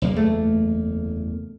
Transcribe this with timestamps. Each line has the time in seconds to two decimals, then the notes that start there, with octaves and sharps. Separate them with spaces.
0.02 F#1 E2 A#3
0.16 A3